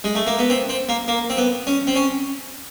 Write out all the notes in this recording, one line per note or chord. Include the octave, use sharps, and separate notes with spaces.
G#3
A3
A#3
B3
C4
C4
A#3
A#3
C4
B3
C#4
C4
C#4